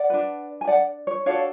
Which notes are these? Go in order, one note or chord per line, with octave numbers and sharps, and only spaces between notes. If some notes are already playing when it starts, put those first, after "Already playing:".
Already playing: D5 F#5
D4 F#4 B4
G#5
D5 F#5
C#5
D4 F#4 A4 C#5 F5